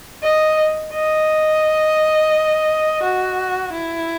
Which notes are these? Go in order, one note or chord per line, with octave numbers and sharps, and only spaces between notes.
D#5
D#5
F#4
E4